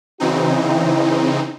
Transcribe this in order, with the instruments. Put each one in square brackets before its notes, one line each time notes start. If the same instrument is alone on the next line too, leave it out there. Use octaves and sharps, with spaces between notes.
[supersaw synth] C#3 E3 C4 D#4 [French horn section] F#4
[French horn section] E4
E4